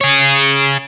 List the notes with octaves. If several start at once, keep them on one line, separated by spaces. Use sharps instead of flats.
G#4 C#5